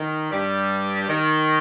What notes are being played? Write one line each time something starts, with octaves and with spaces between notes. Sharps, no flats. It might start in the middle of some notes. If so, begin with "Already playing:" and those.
Already playing: D#3
G2 G3
D#3